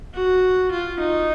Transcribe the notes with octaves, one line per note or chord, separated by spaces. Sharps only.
F#4
F4
D#4